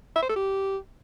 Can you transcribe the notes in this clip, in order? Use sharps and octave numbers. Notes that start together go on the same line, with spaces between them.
E5
C5
A4
G4